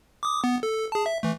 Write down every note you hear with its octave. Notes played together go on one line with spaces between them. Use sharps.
D6 D#6
B3
A4
G#4 A5
E5
E3 A3